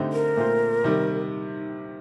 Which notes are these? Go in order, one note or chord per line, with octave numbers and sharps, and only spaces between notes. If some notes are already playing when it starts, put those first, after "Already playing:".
Already playing: D3 A3 C4 D#4 G4
A#4
A#2 A3 C4 F4 C5
C3 D#3 G3